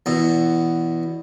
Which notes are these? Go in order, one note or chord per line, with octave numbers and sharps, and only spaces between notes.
E2 B2